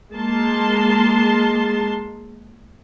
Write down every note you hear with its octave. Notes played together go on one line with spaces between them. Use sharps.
G#3 A#3 A5 C6